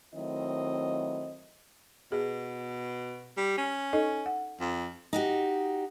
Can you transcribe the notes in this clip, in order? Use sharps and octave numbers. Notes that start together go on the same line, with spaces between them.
D#3 F#3 A3 C4 E4 D#5
B2 G#4
G3
C#4
D#4 A4 D#5
F#5
F2
D#4 F#4 G4